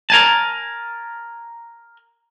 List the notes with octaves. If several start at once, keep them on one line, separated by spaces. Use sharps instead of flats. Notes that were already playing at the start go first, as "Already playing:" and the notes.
A#4 G#5 A5